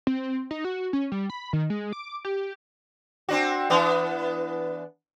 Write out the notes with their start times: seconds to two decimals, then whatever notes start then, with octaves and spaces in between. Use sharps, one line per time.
0.07 C4
0.51 D#4
0.65 F#4
0.93 C#4
1.12 G3
1.30 B5
1.53 D#3
1.70 G#3
1.93 D6
2.25 G4
3.29 C4 D4 F#4
3.70 E3 B3 D4